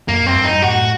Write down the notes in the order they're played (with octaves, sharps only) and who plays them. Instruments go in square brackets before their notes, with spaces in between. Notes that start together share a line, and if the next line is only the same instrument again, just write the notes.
[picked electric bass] F#2 [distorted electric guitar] A#3
[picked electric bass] F#2 [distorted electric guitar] C4
[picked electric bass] G2
[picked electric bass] F#2 [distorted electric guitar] D#4
[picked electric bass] G2
[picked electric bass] F#2 A2 [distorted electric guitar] F#4
[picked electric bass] A2